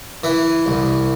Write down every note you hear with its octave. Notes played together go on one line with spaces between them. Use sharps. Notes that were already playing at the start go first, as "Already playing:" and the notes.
E3 E5
C2